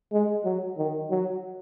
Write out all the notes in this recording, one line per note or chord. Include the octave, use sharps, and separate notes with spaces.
G#3
F#3
D#3
F#3